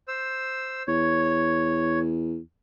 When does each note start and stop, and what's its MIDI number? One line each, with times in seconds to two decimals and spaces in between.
0.08 0.83 72
0.08 0.83 88
0.88 2.39 40
0.88 1.99 73